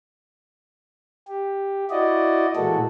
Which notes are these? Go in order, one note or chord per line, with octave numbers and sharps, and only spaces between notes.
G4
E4 F#4 D5 D#5
A#2 E3 G#3 A#3 F#4 A4